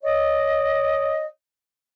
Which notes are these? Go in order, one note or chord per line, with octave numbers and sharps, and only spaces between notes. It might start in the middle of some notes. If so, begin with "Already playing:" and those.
C#5 D#5